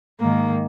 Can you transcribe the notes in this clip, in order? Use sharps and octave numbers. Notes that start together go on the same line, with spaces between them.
G#2 D#3 A#3